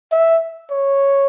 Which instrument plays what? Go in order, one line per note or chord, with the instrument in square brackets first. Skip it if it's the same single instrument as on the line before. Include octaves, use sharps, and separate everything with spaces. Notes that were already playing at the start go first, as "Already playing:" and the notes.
[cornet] E5
C#5